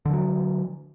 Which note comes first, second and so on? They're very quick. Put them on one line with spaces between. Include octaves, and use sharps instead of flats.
D3 F3 F#3